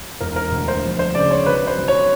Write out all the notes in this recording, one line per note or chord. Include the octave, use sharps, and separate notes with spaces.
E1 A#4
A#4
D2
C5
F2
C5
C#3 D5
C#5
B1 B4
C5
B1
C#5